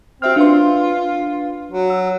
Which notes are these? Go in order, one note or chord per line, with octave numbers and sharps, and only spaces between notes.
C4 F#4 E5 F6
D4 F4 B4 C6
F#3
E6